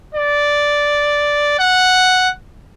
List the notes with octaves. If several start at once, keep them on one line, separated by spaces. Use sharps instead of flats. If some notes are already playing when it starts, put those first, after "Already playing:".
D5
F#5